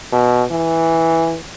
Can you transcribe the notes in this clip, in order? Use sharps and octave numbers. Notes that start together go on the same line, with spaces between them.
B2
E3